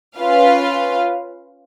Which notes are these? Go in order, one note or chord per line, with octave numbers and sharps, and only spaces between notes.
C#4 F4 B4 F5